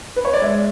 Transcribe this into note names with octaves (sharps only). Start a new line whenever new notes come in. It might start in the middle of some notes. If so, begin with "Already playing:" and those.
B4
C#5
D5
G#3 E5